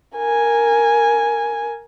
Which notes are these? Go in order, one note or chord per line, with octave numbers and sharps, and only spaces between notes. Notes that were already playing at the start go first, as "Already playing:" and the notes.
A#4 G#5